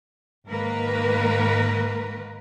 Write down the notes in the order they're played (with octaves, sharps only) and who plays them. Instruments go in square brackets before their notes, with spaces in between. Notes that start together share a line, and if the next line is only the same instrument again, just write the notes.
[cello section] G#2 D#3 A#3 A#4 B4